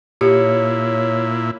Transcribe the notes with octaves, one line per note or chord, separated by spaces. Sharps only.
A#2 E4 G4 C#5